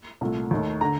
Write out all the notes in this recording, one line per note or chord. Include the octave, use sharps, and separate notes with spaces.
C2 A#2 A3
D#2 D#3 A3
D3 A#5